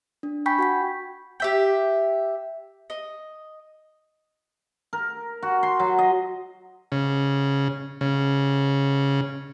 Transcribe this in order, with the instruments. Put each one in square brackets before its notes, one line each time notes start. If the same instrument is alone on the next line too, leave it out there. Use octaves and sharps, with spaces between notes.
[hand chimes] D4
G5 G#5 B5 C#6 G6 B6
F#4 F#5 B6
[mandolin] G4 E5 G5
D#5
[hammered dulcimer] A#4
F#4
C6
F#3
D#5
[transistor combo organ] C#3
C#3